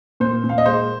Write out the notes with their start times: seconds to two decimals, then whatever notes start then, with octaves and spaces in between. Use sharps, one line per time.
0.20 A#2 C5
0.44 A#2
0.49 F5
0.58 D#5
0.66 G#3 C5